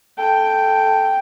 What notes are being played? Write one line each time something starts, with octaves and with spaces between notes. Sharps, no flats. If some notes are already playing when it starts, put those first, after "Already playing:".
A4 G5